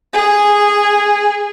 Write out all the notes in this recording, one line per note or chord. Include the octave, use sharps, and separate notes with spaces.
G#4